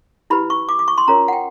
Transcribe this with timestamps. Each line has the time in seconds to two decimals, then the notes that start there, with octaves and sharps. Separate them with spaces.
0.30 E4 G4 B4 B5
0.50 C#6
0.69 D6
0.79 D6
0.88 C#6
0.98 C6
1.08 C#4 F4 A#4 C#5 A#5
1.28 F#5
1.33 G5